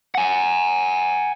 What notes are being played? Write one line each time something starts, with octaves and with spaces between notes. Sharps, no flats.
F#5 G#5